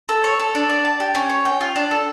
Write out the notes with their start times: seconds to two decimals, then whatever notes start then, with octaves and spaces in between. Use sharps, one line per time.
0.09 A4
0.24 C#5
0.39 A4
0.55 D4
0.69 D5
0.85 A5
1.00 G4
1.15 C#4
1.30 C#5
1.45 G5
1.61 F4
1.76 D4
1.91 A4